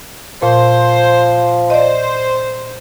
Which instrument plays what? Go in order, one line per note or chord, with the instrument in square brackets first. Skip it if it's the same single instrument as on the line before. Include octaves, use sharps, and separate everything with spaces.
[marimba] A#2 [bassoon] F3 [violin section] C5
[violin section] C5 [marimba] D5 D#5